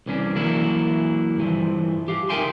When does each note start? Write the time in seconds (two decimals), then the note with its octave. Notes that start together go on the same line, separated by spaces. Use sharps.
0.06 C2 E3 C#4 D4
0.35 E3 F#3 A#3 D4 E4
1.37 G2 E3 F3
2.08 G4 F5
2.29 D#4 A#4 E5 G5 G#5 C6